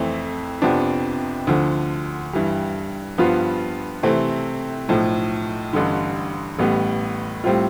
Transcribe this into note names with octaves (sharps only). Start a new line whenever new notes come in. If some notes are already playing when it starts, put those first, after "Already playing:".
Already playing: F2 E3 A3 C4
F2 C3 F3 B3 D4
D2 D3 F3
G2 E3 G3
G2 F3 B3 F4
C3 E3 A3 C4
B1 A2 F3
A1 G2 D3
A1 A2 G3 B3
A2 G3 C4 F4